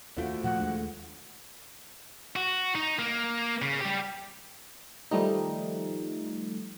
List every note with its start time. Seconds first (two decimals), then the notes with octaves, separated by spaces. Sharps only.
0.17 D#2 D3 A3 C4 F4 F#4
0.44 A#2 F3 F#5
0.59 D#2 G#3 D4
2.36 F#4
2.75 D#4
2.99 A#3
3.62 C#3
3.81 G3 G4
5.11 D#3 F3 G3 A3 D#4